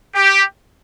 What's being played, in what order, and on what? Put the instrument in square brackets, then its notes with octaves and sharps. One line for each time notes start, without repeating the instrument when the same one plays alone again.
[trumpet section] G4